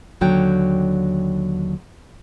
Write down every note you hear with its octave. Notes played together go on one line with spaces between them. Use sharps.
D#2 D3 F#3 G5